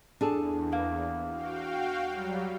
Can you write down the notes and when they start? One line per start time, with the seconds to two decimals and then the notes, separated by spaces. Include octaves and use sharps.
0.21 E2 D4 G#4 A4
0.72 A#3
1.30 F#4 F5 G5
2.06 F#3 G3